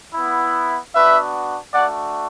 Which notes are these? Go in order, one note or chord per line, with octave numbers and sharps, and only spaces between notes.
B3 E4
B3 D4 F#4 B4 E5
A3 D4 F#4 D5 F#5